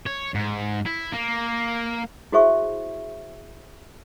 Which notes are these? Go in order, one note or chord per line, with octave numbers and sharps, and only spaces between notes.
C#5
G#2
E4
A#3
E4 F#4 G#4 C5 E5 C#6